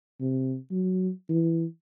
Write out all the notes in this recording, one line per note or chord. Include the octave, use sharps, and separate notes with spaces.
C3
F#3
E3